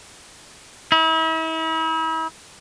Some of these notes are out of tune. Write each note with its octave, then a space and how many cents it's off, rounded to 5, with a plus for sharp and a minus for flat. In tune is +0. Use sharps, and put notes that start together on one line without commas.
E4 -40